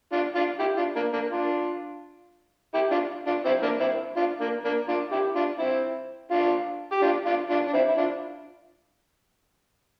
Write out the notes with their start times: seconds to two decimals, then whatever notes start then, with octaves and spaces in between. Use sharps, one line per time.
0.12 D4 F4
0.35 D4 F4
0.59 E4 G4
0.77 D4 F4
0.95 A#3 D4
1.13 A#3 D4
1.31 D4 F4
2.74 E4 G4
2.91 D4 F4
3.27 D4 F4
3.45 C4 E4
3.63 A#3 D4
3.80 C4 E4
4.16 D4 F4
4.40 A#3 D4
4.65 A#3 D4
4.88 D4 F4
5.12 E4 G4
5.35 D4 F4
5.59 C4 E4
6.31 D4 F4
6.92 G4
7.02 D4 F4
7.26 D4 F4
7.50 D4 F4
7.67 D4
7.73 C4 E4
7.89 E4
7.97 D4 F4